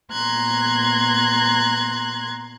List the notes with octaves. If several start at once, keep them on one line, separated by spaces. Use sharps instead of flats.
A#2 B3 A#5 C6 F#6 G#6